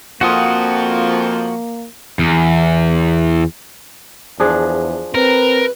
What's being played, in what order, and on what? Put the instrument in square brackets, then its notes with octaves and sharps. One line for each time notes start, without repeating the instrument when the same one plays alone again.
[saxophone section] F2 F3 [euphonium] A#3 [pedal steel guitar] F#4 F#5 D#6
[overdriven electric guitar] E2
[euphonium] E2 [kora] F3 D4 G#4
[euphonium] C4 [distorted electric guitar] A#4 [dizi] B4